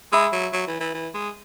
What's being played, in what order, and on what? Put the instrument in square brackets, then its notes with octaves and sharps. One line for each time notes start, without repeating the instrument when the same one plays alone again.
[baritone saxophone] G#3 [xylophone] E5 B5 E6
[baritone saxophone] F#3
F#3
E3
E3
E3
G#3